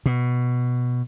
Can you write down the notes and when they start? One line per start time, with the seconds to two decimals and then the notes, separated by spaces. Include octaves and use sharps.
0.06 B2